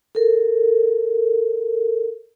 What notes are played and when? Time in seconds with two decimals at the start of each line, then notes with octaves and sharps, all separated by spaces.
0.15 A4 A#4